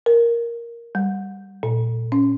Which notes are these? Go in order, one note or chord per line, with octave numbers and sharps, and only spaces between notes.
A#4
G3
A#2
C#4